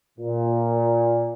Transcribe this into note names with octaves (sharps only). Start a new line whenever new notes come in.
A#2